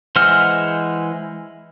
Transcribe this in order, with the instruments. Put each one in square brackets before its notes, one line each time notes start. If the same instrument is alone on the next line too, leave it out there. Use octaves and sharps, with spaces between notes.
[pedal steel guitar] E3 G#3 C5 F#5 F6